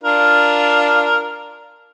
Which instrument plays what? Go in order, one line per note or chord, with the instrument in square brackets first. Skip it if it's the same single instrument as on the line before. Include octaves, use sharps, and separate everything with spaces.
[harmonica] D4 F4 A#4